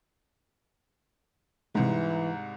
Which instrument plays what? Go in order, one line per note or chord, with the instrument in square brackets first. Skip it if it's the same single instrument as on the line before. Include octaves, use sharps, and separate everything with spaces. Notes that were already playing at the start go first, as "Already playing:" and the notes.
[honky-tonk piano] C2 G#2 [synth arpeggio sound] C3 G#3 [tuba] E3